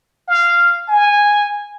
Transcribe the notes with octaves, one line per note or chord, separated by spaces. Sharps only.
F5
G#5